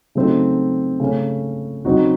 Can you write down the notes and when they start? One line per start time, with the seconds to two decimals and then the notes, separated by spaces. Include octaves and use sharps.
0.15 C#3 F#3 A3 C4 D#4
1.00 C#3 A3 C#4
1.85 C#3 F#3 C4 D#4 F#4